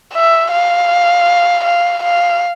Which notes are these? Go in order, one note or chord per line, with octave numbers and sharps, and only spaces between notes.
E5
F5
F5
F5